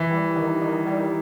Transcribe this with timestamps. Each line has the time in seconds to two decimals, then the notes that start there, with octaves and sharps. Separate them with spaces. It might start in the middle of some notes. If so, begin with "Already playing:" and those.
Already playing: E3
0.10 G3
0.36 D#3
0.61 D#3
0.87 G3